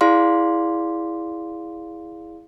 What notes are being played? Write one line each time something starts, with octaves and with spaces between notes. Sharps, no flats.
E4 G#4 D5 F5 C6